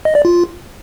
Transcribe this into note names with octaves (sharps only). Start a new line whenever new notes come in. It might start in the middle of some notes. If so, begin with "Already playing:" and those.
D#5
D5
F4